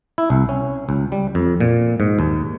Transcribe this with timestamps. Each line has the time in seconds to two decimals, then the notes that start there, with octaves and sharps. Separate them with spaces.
0.18 E4
0.30 C2
0.49 C#4
0.89 C#2
1.12 G3
1.35 F2
1.60 A#2
2.00 G#2
2.19 D#2